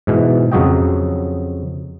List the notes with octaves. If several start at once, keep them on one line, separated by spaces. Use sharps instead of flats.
G#2 B2 E3
F2 C#3 F#3 F#4 D#5 G5